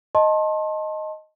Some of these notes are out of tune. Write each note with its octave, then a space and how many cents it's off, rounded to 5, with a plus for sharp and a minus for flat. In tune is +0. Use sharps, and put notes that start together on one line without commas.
D#5 +0 A5 +0 C6 +35